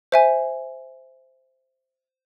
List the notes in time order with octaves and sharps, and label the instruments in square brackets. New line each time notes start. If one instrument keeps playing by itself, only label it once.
[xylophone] C5 E5 G#5